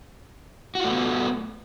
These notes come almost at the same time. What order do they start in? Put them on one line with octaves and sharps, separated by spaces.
F#4 F4 A3 B3